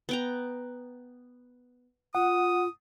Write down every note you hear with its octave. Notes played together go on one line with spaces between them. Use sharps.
B3 G5 A#5
F4 F#5 D#6